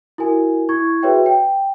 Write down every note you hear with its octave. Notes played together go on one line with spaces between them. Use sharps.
E4 F#4 A#4 G#5
E4 C#6 G#6
F#4 G#4 B4 C#5 E5 G5
G5